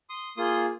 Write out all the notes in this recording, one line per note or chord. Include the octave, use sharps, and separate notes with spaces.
C6 D#6
A#3 F4 G#4 C6 D#6